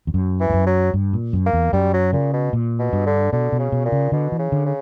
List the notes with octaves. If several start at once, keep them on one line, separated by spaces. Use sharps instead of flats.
E2
F#2
E3
G2
F#2
F#3
G2
A#2
F#2
A#3
E2
F#2 G3
F#3
A#2 C#3
B2
A#2
B2
G2
D3
B2 D3
B2
C#3
B2
A#2
C#3
B2 D3
E3
C#3
D3
C#3